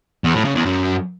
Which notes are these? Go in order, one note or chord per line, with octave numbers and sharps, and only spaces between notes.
E2
A2
C#3
E2
F#2